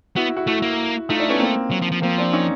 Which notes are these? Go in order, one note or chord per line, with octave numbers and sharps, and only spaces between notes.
B3 E4 F#4
E4 F#4
A3 E4 F#4
A#3
A3 D#4 F4
D4 E4
B3 C#4
A#3 C4
F#3
F3
F3
F3 A#3 C4
C4 D4
C#4 D#4